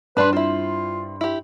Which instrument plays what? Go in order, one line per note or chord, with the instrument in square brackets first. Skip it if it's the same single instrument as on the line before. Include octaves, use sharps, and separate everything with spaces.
[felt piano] G2 C6 [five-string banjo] G3 D4 [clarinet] B4
[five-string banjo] C4 E4 [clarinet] F4
[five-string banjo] E4 G4